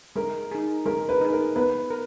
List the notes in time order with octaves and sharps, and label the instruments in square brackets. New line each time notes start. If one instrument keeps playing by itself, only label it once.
[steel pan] G#3 [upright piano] A#4
[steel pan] D#4 G#4
[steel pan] G#3 [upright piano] A#4
[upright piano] B4
[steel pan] D#4 G#4
[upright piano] A#4
[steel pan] B3 [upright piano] B4
[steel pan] A#4